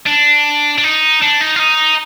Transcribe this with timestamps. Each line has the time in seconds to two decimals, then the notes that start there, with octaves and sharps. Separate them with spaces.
0.07 D4
0.78 D4
0.84 D#4
1.22 D4
1.41 D#4
1.56 F4
1.60 D#4